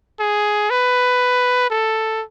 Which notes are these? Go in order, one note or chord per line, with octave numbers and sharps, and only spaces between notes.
G#4
B4
A4